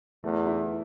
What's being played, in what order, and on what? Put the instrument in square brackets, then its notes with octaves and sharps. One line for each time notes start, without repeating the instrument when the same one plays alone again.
[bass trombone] E2 [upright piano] A3
[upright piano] E4